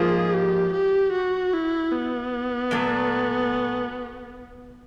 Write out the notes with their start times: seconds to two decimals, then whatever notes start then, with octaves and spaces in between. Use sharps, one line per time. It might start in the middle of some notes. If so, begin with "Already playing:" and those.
Already playing: G#2 F3 A#3 F4 G#4
0.34 G4
0.74 G4
1.13 F#4
1.53 E4
1.93 B3
2.71 A#2 F#3 A3